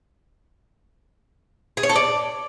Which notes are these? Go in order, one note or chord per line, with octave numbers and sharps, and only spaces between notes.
G#4
C#5
A4
D5